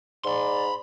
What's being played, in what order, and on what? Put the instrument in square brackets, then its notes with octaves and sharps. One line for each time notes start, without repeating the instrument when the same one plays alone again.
[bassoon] G#2 [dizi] D5 [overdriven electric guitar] B5 C6